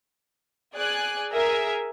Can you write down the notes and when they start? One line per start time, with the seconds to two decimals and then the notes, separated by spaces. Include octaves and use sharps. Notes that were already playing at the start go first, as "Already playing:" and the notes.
0.75 G#4 D5 G#5 F#6
1.33 G#4 A#4 E5 A#5